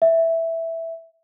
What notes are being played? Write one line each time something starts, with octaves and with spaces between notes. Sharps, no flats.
E5